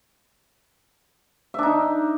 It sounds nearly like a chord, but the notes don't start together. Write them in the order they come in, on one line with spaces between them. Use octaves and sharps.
E5 D4 D#4